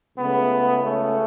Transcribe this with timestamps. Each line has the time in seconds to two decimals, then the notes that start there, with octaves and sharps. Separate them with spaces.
0.17 C#2 C#3 A3 B3
0.83 A3 C#4